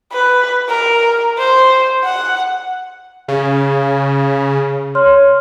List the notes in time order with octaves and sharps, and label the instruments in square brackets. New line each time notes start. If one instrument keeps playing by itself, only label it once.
[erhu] B4
A#4
C5
F#5
[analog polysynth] C#3
[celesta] C#5 C6 F6